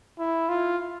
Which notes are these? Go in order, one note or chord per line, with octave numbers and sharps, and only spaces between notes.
E4
F4